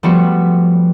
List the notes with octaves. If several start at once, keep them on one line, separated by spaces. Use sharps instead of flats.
F3 G3 A3 B3 F#4